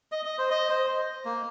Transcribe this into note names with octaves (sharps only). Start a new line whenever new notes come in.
D#5
D#5
C5
D#5
C5
A#3